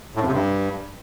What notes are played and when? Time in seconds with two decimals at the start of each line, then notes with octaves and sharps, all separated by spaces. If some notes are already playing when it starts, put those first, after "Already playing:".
0.15 A2
0.21 F2
0.27 C3
0.33 G2